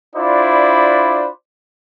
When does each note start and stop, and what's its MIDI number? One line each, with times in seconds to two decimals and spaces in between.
0.16 1.28 62
0.16 1.28 64
0.16 1.28 65
0.16 1.28 72
0.16 1.28 74
0.16 1.28 83